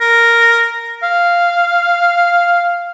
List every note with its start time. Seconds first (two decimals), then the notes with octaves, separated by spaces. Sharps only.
0.01 A#4
1.03 F5